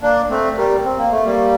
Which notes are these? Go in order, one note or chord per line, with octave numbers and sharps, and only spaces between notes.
A#3 D4
A3 C4
G3 A#3
C4
A#3
A3
G3 A#3